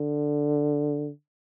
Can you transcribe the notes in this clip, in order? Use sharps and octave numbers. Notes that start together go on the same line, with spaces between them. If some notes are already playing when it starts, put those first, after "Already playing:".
Already playing: D3